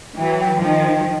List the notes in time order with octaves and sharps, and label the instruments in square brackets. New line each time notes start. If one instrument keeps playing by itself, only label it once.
[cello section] E3 F#3 [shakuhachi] G5
[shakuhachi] G5
[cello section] D#3 F3 [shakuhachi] G5